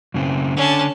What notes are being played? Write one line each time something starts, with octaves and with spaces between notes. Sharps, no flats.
F#2 C#3 C4
D3 C#4 A5